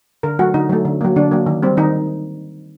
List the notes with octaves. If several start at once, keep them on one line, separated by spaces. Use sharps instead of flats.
D3 A#4
F#3 A3 F#4
D3 D#4
F#3 A3
D3
F#3 A#3
D3 D4
F#3 A#3
D#3
G3 C4
D#3 D#4